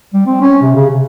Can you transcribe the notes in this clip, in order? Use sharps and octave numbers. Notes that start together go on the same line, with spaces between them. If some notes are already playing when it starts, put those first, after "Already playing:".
G3
C4
C#4
C3
C#3
C3